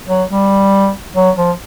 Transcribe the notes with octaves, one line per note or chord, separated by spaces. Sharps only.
F#3
G3
F#3
F3